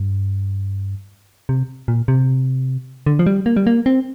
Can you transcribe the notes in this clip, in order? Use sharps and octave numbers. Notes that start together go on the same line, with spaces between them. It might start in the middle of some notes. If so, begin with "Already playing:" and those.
Already playing: G2
C3
A#2
C3
D3
F3
G3
A#3
G3
A#3
C4